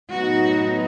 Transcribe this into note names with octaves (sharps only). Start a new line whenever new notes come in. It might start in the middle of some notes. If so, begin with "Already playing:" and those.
A2 F#3 B3 D#4 F#4